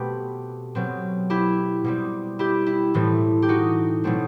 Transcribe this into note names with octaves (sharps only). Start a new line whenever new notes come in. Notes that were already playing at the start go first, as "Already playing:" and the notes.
Already playing: B2 A3 C4 G4 B4
B2 F#3 C4
E4 G4
B2 G3 C4
E4 G4
E4
A2 E3 A3 C4
G4
D#4 F#4
B2 F#3 A3 C4